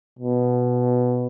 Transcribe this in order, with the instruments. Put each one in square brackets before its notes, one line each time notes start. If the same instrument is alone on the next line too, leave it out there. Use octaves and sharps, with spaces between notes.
[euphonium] B2